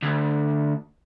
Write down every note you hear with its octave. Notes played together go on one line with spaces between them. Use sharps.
D2